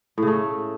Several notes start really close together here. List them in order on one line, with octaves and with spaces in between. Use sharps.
A2 C#3 A3